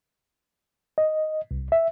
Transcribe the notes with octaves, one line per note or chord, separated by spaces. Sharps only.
D#5
C2
E5